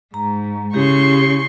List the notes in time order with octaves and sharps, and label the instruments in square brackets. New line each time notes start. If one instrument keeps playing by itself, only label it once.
[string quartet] G#2 [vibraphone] A#5
[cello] C#3 [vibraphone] E4 G4 [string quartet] C6 C#6